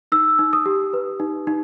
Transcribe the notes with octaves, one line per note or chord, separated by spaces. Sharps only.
D#4 E6
D#4
D#6
G4
B4
D#4
D#4